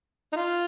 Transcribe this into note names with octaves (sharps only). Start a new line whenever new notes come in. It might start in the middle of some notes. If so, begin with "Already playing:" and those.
D#4
F4